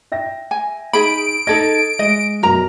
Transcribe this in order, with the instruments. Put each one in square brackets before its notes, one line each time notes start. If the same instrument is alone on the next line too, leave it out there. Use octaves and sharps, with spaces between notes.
[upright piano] E5 G5 A#6
[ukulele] G#5
[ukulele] D#4 G#4 B5 [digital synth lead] D7
[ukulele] D#4 A4 D#5 [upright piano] G#6
[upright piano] G#3 [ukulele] D#5
[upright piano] F#2 B2 [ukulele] A#4 A#5